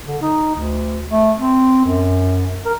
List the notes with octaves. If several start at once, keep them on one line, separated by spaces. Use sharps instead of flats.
D3
D#4
D2
A3
C4
F#2
A#4